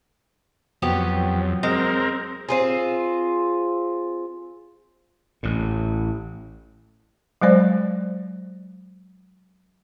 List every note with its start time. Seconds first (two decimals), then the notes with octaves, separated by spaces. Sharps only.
0.82 F2 F#3 B3 G4 C#5
1.63 G#3 C4 A#4
2.49 C4 F4 G#4
5.43 A1 A2
7.41 F#3 G#3 C5 D5